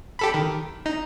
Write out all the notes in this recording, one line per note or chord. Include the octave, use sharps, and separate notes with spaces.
G4 A4 B5
D#3
D#4